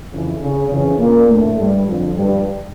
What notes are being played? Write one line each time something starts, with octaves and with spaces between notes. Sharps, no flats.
F2 C#3 E3
C#3 C#4
F2 C#3 E3 C#4
A#2 A#3
F2 A2 D3 A3
G2 G3
F2 D3 F3
G2 G3